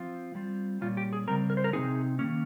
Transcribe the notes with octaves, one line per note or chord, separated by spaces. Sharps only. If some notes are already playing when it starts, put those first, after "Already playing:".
Already playing: F3 C4 F4
G3 C4 F4
A#2 G3 C#4 F4
G4
G#4
C#3 G3 C4 A#4
A#4
C5
A#4
C3 F3 C4 D#4 G#4
D#3 A#3 C#4